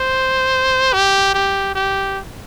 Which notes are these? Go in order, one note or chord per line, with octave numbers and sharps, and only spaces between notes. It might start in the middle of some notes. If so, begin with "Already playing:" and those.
Already playing: C5
G4
G4
G4